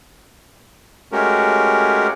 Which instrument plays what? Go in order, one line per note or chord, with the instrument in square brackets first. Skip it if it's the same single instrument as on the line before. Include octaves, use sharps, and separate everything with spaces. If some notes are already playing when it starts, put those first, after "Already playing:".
[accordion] G#3 A3 C#4 F#4 G4 A#4